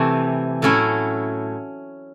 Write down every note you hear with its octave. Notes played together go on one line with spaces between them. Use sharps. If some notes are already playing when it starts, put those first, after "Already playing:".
Already playing: C3 E3 A3
A2 F#3 A3 C#4 E4